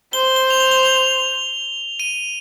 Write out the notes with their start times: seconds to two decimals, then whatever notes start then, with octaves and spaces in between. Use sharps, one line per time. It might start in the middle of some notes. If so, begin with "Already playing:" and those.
0.13 C5 G7
0.36 G7
0.50 F7
0.60 G7
0.71 G7
0.83 F7
2.00 D#7